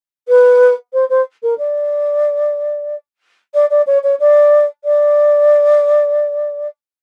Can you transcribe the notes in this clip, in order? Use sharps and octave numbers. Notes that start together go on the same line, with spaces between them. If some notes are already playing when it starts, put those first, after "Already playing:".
B4
C5
C5
A#4
D5
D5
D5
C#5
C#5
D5
D5